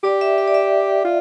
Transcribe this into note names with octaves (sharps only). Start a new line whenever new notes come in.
G4 D5
E5
E5
D5
E5
F4